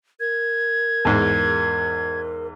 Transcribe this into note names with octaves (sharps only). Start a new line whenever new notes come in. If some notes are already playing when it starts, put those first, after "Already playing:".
A#4 G#6
E2 G#2